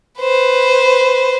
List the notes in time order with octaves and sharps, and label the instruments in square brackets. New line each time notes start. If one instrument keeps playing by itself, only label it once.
[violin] B4 C5